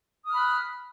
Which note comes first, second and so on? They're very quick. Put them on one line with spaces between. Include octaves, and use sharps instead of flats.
D#6 F6 B5 F#6